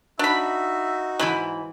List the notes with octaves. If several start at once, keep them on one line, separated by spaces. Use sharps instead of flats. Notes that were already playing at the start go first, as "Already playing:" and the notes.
D4 D#4 F#4 E5 B5
G#2 E3 F#3 B5